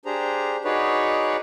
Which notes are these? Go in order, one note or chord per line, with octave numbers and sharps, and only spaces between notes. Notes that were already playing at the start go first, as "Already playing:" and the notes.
D4 G4 G#4 C5 A#5
D#4 F#4 G#4 B4 C#5 D5